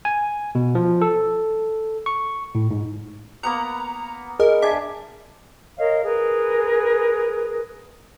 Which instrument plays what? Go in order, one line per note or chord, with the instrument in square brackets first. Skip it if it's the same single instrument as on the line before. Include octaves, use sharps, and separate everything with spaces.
[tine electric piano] G#5
B2
F3
A4
C#6
A2
G#2
[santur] A#3 B3 F#5 [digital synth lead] A#5
[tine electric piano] G#4 D#5 [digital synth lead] A#4
[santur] D4 G#5 [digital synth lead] E5
[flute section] A#4 C#5 D#5 F5
G#4 A#4 B4